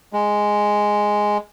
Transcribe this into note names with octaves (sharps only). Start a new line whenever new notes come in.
G#3